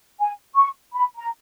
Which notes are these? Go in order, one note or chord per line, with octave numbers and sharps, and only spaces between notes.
G#5
C#6
B5
A#5